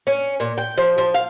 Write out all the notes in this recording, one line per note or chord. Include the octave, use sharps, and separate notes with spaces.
C#4
A#2
G5
F3
F3
F5